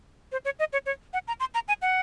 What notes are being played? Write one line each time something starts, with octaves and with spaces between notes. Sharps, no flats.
C5
C#5
D#5
C#5
C#5
F#5
A#5
C6
A#5
G#5
F#5